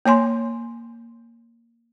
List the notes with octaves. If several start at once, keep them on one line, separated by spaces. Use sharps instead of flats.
A#3 C#5 G#5 C6